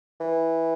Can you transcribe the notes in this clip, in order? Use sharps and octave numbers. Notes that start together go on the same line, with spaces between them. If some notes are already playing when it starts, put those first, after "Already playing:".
E3